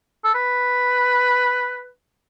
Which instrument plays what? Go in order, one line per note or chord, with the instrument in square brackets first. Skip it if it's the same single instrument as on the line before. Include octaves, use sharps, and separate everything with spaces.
[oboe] A4
B4